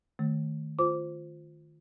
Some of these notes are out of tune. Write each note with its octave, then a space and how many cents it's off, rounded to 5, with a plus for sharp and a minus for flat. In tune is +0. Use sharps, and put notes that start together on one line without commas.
D#3 -10 A3 +0
F4 +0 C5 +0 D6 -15